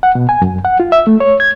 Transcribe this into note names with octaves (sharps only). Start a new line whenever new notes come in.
F#5
B2
G#5
F#2
F#5
F4
E5
A3
C#5
G#6